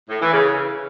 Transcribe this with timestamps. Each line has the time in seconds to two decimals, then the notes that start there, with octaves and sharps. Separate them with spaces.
0.10 A2
0.21 E3
0.32 C#3